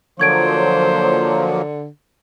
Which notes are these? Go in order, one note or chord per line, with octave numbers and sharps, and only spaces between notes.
D3 F3 F#3 A#3 C5 C#6 G#6 D7